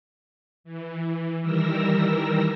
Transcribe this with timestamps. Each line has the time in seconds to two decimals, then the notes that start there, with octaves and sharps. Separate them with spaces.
0.64 E3
1.41 D#3 E3 G3 A#4 E6 A#6